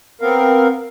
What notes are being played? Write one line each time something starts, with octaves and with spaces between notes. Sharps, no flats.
B3 C4 A#4 F5